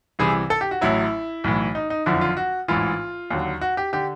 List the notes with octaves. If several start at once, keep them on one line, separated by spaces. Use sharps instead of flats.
C2 C3 E3 G#4
A4
G4
F#4
A1 A2 F#3 E4
B1 A2 E3
D#4
D#4
F#1 F2 D3 F3 E4
F4
F#4
A1 G#2 E3 F4
D#2 D3 F#3
F#4
G4
D3 G4